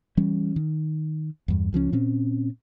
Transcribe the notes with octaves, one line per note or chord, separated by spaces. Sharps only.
E3 G3 C#4
D#3
E2 G2
C#2 F3 A3 C#4
A#2 C4 C#4